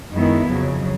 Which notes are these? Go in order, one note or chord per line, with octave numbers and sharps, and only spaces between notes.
F#2 D#3 G#3 B3 E4
F2 C#3 F#3